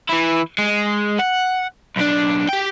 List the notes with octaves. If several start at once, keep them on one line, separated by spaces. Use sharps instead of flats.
E3 E4
G#3
F#5
B1 D4
G4 G5